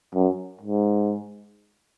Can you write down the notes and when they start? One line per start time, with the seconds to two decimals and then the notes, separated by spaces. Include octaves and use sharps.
0.14 F#2
0.61 G#2